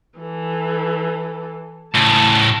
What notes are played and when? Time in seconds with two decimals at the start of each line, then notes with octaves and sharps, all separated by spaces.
0.19 E3 A4
1.95 A2 C#3 A5